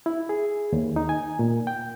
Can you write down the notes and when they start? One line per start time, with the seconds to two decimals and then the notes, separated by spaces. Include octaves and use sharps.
0.06 E4
0.29 G#4
0.73 D#2
0.96 D#4
1.09 G#5
1.39 A#2
1.67 G5